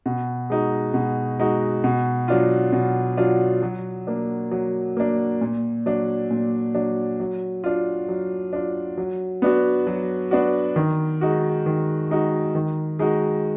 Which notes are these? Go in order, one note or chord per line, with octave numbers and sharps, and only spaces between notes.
B2
G#3 D#4 F#4
B2
G#3 D#4 F#4
B2
F#3 D4 F4
B2
F#3 D4 F4
F#3
A#3 D4
F#3
A#3 D4
A#2
F#3 D4
A#2
F#3 D4
F#3
D4 F4
F#3
D4 F4
F#3
B3 D4 F#4
F#3
B3 D4 F#4
D#3
G#3 D#4 F#4
D#3
G#3 D#4 F#4
D#3
G#3 D#4 F#4